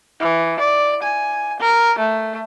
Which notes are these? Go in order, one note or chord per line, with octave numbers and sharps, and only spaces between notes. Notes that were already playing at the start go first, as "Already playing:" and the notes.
E3
D5
G#5
A#4
A3